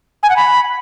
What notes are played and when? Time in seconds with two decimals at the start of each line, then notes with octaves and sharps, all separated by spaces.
0.23 G#5
0.29 F#5
0.36 B5